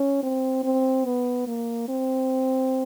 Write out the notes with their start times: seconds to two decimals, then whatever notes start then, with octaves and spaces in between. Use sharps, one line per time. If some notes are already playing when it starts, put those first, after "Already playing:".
Already playing: C#4
0.23 C4
0.64 C4
1.06 B3
1.47 A#3
1.89 C4